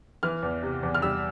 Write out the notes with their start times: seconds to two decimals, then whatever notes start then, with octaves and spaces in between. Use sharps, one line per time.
0.23 E3 F6
0.43 E2
0.63 C3
0.83 E2
0.94 F6
1.02 G3 E6